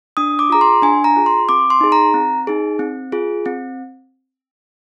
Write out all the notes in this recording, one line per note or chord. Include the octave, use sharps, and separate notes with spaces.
D4 D#6
D6
F4 G#4 A#5
C6
D4 G#5
A#5
F4 G#4
C6
C4 D6
C6
D#4 G#4
A#5
C4
D#4 G#4
C4
F4 G#4
C4